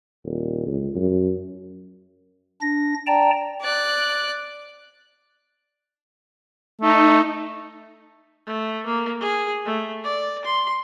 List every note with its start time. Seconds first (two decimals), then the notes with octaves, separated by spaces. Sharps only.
0.25 D#1
0.66 C#2
0.95 F#2
2.61 D4 A#6
3.07 D5 G5 A5 A#5
3.62 D5 F#6
6.81 A3 D#4
8.47 A3
8.86 A#3
9.21 G#4
9.65 A3
10.04 D5
10.45 C6